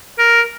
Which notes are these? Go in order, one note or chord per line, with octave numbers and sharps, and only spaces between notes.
A#4